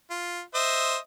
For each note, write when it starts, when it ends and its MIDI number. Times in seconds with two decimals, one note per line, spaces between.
0.10 0.41 65
0.54 0.97 72
0.54 0.97 75
0.54 0.97 76